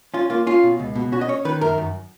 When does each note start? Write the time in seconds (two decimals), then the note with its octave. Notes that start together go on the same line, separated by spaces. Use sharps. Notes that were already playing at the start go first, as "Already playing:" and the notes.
0.14 C#4 F4
0.30 A#3 F4
0.47 C#4 F4
0.63 B2
0.79 C#2
0.96 B2
1.12 C#4 F#4
1.21 D#5
1.28 C#4 C#5
1.45 D#3 B4
1.61 F#2 A#4
1.78 F#2